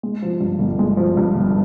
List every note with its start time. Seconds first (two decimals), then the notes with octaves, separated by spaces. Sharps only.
0.03 G#3
0.22 F3
0.40 G2
0.59 G1
0.79 G#3
0.97 F3
1.17 G2
1.35 G1